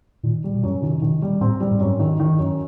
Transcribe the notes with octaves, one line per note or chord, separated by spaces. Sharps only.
A#2 D#3
G3
B2
F#2
C3 D#3
B2 D#3
G3
A2 C4
G3
G#2
F#2
D#3
D#3
F#2